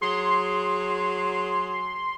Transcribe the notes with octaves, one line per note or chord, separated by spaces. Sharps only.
F#3 G#4 C6